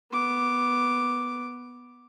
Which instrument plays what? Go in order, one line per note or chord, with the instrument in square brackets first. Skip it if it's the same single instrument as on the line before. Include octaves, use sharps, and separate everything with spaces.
[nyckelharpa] B3 D6